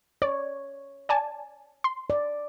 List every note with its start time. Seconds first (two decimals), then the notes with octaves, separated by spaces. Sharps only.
0.22 C#5 D5
1.09 D5 G#5 A5
1.84 C6
2.10 D5